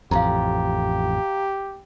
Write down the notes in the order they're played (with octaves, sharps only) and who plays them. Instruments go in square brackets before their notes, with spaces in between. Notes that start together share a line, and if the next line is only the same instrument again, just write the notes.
[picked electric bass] A1 F2 [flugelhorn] G4 [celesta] F5 A#5